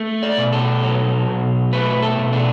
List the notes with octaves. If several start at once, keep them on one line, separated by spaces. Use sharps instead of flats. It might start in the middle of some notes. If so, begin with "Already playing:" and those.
Already playing: A3
D5
B2
A4
F#3
B2
A3 B4
A4
B2
D4